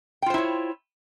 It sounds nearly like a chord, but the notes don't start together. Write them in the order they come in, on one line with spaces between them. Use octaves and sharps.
G5 F4 C5 E4 C#5